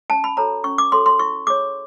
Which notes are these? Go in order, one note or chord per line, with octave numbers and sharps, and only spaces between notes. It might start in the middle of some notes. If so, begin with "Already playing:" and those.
C#4 A5
B5
F#4 A4 C#5 A#5
C#4 C#6
D6
F#4 A4 C#5 C6
C6
E4 C#6
G#4 C#5 D6